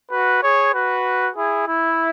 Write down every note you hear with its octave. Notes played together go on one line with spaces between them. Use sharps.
F#4 B4
G#4 C#5
F#4 B4
E4 G#4
E4